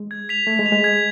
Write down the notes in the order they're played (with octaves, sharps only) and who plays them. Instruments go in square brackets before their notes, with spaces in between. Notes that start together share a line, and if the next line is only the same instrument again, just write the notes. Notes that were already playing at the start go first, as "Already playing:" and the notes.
Already playing: [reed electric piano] G#3
[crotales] G#6
B6 F7
[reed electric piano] A3 [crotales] G#6
[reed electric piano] G#3
[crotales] B6 F7
[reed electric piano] G#3
[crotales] G#6